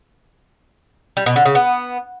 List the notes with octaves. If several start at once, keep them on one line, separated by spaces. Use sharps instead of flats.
G3
B2
D3
C#3
B3